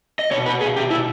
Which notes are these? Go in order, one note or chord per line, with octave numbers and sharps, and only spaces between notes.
D#5
B2 C#5
B4
G#4
G4
E4